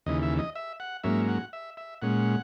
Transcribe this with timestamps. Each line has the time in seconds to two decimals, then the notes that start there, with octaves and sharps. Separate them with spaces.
0.06 D#2 C#3 E3 D#5
0.23 E5
0.38 D#5
0.56 E5
0.80 F#5
1.03 G#2 F#3 A#3 C#4 E5
1.28 F#5
1.53 E5
1.77 E5
2.02 A#2 G#3 C#4 F#5